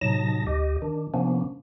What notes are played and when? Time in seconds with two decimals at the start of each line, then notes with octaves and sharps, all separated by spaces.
0.01 A2 C3 F#3 D#4 A5 A#6
0.47 D2 G4 D#5
0.82 D#3 D4
1.14 C3 F3 A#3 B3 C#4 D4